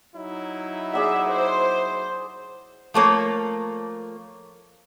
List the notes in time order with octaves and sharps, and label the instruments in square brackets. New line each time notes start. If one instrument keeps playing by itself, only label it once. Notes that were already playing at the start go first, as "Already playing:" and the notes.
[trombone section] F#3 D#4 E4
[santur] G#4 D5 F#5 [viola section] E5
[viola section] C5
[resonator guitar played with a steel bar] F3 A3 A#3 C#5